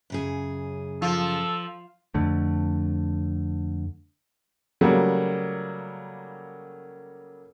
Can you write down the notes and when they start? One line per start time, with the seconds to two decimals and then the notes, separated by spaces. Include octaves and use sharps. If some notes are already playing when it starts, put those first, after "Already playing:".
0.10 F#2 C#3 G#4
1.02 F3 A4
2.14 F2 D3 A3
4.81 C#3 F#3 G3 A3 A#3